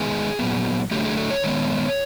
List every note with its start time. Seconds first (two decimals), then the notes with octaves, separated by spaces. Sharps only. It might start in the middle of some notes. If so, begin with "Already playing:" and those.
Already playing: D#3 G#3 B3 G#4
0.39 A#2 F#3 B3
0.91 D3 F#3 A3 G4
1.05 G#4
1.18 A4
1.30 C#5
1.44 D#3 G#3 B3